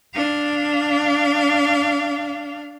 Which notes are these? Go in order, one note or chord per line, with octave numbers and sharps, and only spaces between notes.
D4 F5